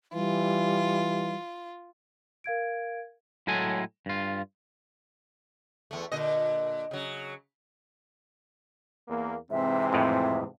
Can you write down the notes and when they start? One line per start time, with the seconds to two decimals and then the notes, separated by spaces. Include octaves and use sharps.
0.14 E3 G3 F4
2.44 A#4 F5 G#6 D7
3.47 A2 F#3 G#3 A4 G#5
4.06 G2 F4
5.91 E2 A3
6.12 A#2 D3 D#5
6.91 C#3 F#3
9.08 E2 A#3
9.51 G#2 C3 E3 C4 E5
9.93 F2 A2 E5